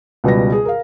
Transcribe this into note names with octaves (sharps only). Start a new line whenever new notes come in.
C#2 B2 G3 B4 A#6
G#4
A#4 F5